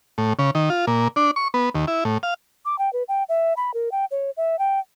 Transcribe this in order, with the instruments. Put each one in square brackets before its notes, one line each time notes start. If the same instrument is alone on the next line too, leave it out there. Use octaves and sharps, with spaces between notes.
[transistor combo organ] A2
C#3
D#3
F4
A#2
D4
C#6
B3
D#2
E4
A2
F5
[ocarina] D6
G5
B4
G5
E5
B5
A#4
G5
C#5
E5
G5